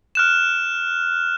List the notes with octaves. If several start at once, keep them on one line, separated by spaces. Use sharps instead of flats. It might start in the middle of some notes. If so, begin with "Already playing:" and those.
F6 F#6 E7